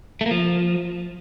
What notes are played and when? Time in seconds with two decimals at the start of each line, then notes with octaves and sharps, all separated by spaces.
0.21 A3
0.26 A#3
0.31 F3